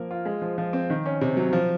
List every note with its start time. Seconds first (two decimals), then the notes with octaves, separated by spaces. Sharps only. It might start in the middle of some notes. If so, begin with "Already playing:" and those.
Already playing: F3 A#3 A#4
0.11 F4
0.25 G#3
0.42 F3
0.58 F3
0.73 C4
0.90 D#3
1.06 C#4
1.21 C3
1.37 F#3
1.53 F3